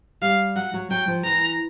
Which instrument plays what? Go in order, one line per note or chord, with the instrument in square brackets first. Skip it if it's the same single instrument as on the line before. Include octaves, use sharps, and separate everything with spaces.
[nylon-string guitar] G3 [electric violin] F5
[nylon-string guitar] F#3 [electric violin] F#5
[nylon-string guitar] F#3
[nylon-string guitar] F#3 [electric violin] G5
[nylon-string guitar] F3
[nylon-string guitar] E3 [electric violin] A#5